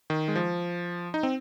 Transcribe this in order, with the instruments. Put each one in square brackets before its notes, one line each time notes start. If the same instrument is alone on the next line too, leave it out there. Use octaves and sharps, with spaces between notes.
[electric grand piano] D#3
G#3
F3
D#4
C4